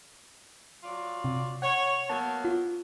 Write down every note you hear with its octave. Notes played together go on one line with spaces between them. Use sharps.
F#3 F4 D5
C3
C#5 F#5
F#3 A#3 B3 A5
F4